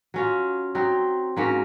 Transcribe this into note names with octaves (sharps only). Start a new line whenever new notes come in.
F#3 C#4 F4
F#3 C4 D#4
G#2 F#3 A#3 C#4